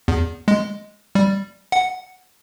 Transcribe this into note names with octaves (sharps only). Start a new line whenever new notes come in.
E2
G#3
G3
F#5